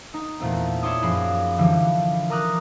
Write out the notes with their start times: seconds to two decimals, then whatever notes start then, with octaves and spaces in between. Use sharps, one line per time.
0.14 D#4
0.40 E2 A#2 A3 C4
0.82 E4 C#5 D5 C6 D6 D#6
1.03 F#2 F3 G#4 B5 C7
1.58 D3 E3 F3 G3
2.30 A#4 A#5 D6 D#6 F6 F#6